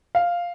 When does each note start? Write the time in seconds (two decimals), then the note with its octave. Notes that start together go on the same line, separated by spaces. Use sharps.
0.15 F5